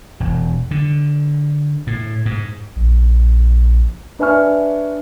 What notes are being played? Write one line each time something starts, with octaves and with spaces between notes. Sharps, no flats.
E1
D3
A2
G#2
A#1
D4 B4 E5 G#5 C#6 F6